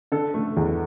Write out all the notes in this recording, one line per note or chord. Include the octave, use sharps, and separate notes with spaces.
D3 A4
A3
E2